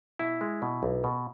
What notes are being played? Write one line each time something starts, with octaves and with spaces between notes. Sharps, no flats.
B2 E4
G#3
B2
B1
B2